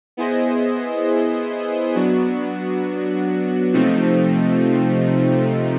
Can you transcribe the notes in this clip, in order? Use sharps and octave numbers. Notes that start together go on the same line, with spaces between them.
B3 E4 G#4 C5 D#5
F#3 B3 D4 F#4
C3 F3 A3 C4 D#4